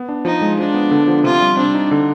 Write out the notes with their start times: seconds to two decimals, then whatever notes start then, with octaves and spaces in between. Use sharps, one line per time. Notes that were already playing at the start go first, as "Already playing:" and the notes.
Already playing: B3
0.09 D4
0.25 F3 D#4
0.42 G#3
0.59 F3 D4
0.74 B3
0.91 D3
1.07 F3
1.24 C3 F4
1.41 G3
1.57 C4 D4
1.74 D#4
1.91 D3